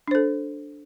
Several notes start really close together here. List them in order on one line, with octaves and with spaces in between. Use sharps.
D4 C5 A4